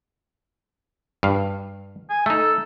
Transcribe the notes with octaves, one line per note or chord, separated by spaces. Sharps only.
G2 F5
G#5
A3 D#4 A4